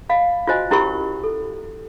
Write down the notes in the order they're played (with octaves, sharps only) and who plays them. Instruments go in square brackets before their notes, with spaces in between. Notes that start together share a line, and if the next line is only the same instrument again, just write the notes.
[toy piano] D#5 F5 B5
F4 F#4 C5 D#5 G#5
C#4 E4 G4 A#4 B5 C#6
A4